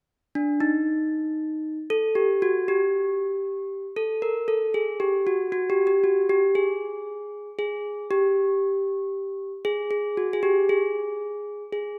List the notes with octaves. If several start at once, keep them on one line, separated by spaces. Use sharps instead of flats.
D4
D#4
A4
G4
F#4
G4
A4
A#4
A4
G#4
G4
F#4
F#4
G4
G4
F#4
G4
G#4
G#4
G4
G#4
G#4
F#4
G#4
G4
G#4
G#4